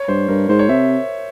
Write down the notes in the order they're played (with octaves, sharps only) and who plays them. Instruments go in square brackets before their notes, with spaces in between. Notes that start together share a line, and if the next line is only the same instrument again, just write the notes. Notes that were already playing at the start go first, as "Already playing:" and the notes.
Already playing: [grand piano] C#5
[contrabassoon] G2 [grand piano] C5
[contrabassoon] G2 [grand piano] A#4
[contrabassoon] G#2 [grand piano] C5
[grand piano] C#5
[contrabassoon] C3 [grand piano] E5